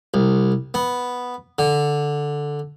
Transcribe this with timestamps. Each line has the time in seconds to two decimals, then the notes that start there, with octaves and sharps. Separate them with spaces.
0.14 C2
0.74 B3
1.59 D3